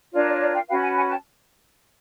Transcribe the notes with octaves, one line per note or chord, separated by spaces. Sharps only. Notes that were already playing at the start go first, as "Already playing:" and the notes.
D4 F4 A#4 C#5 D5
D5
D5
F5 G5
C#4 F#4 B4 F5 G5
F#5 G#5
F#5 G#5
G5 A5